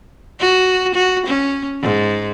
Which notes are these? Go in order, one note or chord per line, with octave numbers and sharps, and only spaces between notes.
F#4
F#4
C#4
G#2